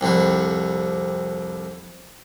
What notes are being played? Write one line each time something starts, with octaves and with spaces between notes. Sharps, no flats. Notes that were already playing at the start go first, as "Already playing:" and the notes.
C2 F2 D3 G3